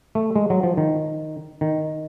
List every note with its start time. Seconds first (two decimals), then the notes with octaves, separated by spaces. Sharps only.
0.15 A3
0.36 G#3
0.50 F#3
0.63 F3
0.77 D#3
1.61 D#3